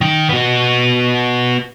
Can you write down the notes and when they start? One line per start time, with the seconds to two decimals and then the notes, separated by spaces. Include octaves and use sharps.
0.01 D#3 G5
0.29 B3 F#4